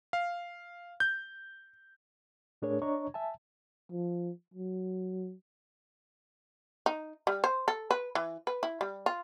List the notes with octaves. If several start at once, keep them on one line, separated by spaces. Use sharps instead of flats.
F5
G6
A2 A3 D4 G#4 A#4 C#5
D4 C#5 D#5 A#5 C#6
E5 G#5 A5
F3
F#3
D#4
G3
C5
A4
B4
E3
B4
E4
G3
F4